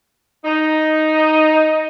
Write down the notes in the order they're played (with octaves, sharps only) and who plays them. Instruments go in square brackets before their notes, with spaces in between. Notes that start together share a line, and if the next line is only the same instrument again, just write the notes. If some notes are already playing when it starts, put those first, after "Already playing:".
[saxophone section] D#4